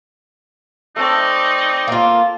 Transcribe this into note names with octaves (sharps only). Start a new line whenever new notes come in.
A3 C4 D#4 D5 A5
A#3 F4